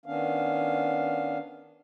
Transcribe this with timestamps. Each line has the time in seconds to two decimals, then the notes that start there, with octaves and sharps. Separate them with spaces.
0.06 D#3 B3 C#4 D4 F5